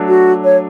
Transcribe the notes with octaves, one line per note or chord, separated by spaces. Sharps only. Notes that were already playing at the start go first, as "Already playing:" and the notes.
Already playing: F#3 A3 D4
F#4
C#5